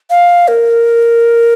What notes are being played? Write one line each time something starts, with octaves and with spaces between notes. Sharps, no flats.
F5
A#4